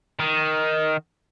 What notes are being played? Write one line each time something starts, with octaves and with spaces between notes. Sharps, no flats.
D#3